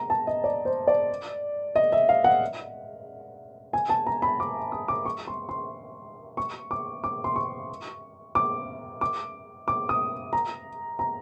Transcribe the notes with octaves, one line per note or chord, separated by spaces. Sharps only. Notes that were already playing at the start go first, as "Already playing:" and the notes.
Already playing: A#5
A5
D#5
D5
C5
D5
D#5
E5
F5
F#5
G#5
A5
A#5
B5
D6
D#6
D6
C#6
C6
C6
C#6
D6
D6
C6
C#6
D6
D6
D6
D#6
A#5
A#5